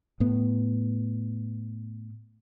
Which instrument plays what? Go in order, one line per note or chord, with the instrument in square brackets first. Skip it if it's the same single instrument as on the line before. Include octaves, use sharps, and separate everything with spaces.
[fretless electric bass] A2 B3